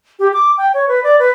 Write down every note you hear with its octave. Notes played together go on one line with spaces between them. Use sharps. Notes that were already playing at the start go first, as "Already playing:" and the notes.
G4
D6
G5
C#5
B4
D5
B4